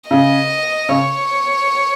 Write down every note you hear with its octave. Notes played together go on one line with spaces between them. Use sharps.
C#3 D#5
C#3 C#5